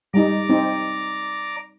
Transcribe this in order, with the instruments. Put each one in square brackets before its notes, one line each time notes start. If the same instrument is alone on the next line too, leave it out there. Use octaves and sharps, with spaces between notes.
[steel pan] G3 D#4 [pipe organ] D5 A#5 D6
[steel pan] C4 D#4